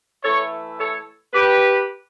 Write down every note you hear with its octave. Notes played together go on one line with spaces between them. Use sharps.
E3 A3 E4 A4 C#5
A4 C#5
G4 B4